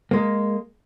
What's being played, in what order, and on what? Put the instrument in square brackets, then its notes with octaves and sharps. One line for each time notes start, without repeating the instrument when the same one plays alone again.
[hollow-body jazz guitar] G#3 A#3